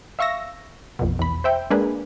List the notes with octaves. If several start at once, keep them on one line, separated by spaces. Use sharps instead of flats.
E5 F5 C#6 E6 A#6
A#1 F2 B2
E2 B5
C5 E5 G5
G#3 A#3 D4 G#4 B4